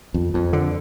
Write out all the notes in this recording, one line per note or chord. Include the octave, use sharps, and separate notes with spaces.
F2
F2
D3